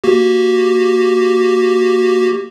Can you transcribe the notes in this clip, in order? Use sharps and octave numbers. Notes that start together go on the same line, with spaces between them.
A#3 F#4 G4